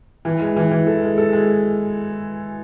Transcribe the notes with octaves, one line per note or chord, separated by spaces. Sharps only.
E3
G#3
E3
E3
A4
G#3
A4
G#3